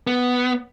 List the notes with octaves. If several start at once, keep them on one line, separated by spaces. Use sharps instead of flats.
B3